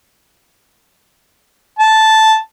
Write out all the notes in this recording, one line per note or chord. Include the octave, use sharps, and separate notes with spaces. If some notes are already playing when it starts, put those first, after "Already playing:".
A5